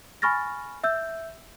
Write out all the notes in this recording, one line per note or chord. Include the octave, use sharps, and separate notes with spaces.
G#5 B5 C#6 F6 A6 A#6
E5 E6 G6